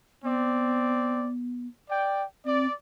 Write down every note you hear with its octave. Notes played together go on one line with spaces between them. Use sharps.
B3 C4 D5
D5 G5
C4 D5